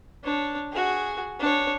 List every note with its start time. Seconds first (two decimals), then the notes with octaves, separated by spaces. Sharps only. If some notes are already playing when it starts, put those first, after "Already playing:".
0.24 D4 C#5
0.72 F#4 G#4
1.40 D4 C#5